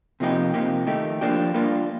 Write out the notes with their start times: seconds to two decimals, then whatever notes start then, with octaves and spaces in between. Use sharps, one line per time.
0.20 C3 F3 A#3 D#4 G4
0.54 C3 F3 A#3 D#4 G4
0.87 D#3 A3 D#4 G4
1.21 F3 A#3 D4 G4
1.54 G3 A#3 D4 F4